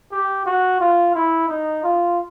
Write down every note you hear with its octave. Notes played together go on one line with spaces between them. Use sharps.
G4
F#4
F4
E4
D#4
F4